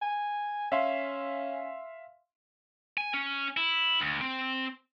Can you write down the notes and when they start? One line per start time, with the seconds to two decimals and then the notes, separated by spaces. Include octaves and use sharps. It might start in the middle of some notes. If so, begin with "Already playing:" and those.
0.02 G#5
0.72 C#4 E5 F5 C6
2.97 G#5
3.14 C#4
3.57 E4
4.02 D2
4.21 C4